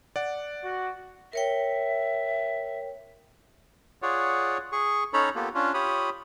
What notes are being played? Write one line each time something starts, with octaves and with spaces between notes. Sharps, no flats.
D5 F#5
F#4
A#4 C#5 E5 G5
F4 G#4 C#5 D5 F#5
G#4 C#6
C#4 D#4 A4 C#5 A#5 B5
A#3 B3 F4 G4 A4
C#4 D4 F4
F4 G4 C#5 B5 D#6